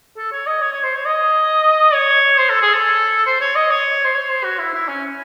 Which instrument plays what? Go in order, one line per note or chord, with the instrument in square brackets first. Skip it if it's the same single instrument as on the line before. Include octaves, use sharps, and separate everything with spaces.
[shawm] A4
C#5
D#5
C#5
C#5
C5
C#5
D#5
C#5
C5
A4
G#4
A4
C5
C#5
D#5
C#5
C5
C#5
C5
F#4
E4
E4
C#4